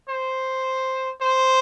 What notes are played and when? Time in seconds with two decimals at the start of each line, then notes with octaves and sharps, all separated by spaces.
0.09 C5
1.22 C5